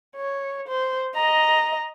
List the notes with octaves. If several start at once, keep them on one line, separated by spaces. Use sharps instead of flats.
C#5
C5
D#5 A#5